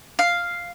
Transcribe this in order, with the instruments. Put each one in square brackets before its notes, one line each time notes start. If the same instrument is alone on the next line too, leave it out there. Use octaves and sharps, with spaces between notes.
[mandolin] F5